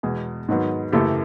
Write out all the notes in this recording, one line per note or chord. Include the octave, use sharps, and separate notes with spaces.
E2 B2 G#3 G#4
G#2 D#3 F#3 B3
F#2 C#3 E3 A3 G4 A4